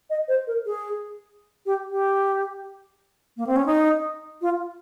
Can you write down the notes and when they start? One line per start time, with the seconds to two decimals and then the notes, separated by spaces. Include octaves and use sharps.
0.10 D#5
0.28 C5
0.47 A#4
0.66 G#4
1.66 G4
1.91 G4
3.37 A#3
3.47 C4
3.56 C#4
3.66 D#4
4.41 F4